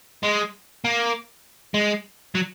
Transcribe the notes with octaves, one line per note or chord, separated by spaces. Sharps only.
G#3
A#3
G#3
F#3